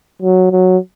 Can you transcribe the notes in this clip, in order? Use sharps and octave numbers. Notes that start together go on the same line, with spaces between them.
F#3
F#3